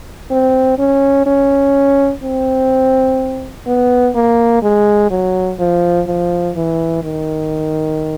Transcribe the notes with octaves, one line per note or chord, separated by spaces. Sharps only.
C4
C#4
C#4
C4
B3
A#3
G#3
F#3
F3
F3
E3
D#3